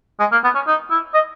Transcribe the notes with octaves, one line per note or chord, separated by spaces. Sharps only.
G#3
A#3
B3
C#4
D#4
E4
D#5